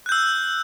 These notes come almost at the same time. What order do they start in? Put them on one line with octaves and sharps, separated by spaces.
F#6 G6 E6